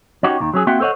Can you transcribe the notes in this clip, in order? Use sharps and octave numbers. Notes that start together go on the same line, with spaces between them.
C#4 D#4 F#4 G4
D#2 D#3
F#3 C#4 G#4
A#3 C4 F#4 E5 F#5 G5
A4 C5 C#5 D#5 F#5